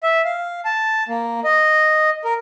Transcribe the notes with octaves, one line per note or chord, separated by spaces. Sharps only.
E5
F5
A5
A#3
D#5
A#4